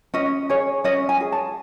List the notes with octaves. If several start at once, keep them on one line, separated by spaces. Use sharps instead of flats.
C#4 D#5
G#4 C#5
C#4 D#5
G#5
G#4
A5